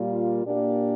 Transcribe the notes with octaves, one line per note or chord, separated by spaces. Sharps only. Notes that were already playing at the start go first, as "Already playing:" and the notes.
Already playing: A#2 G3 A#3 F4
A#2 A#3 D4 G4 D5